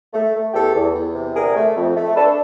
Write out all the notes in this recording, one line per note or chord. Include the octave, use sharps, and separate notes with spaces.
A3
A3
E2 G4 A4
E2
E2
C3
D3 G#4 A#4
A3
F2
A3
D4 A4 B4